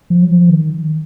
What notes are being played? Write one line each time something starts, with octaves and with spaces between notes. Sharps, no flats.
F3
F#3
F3
D#3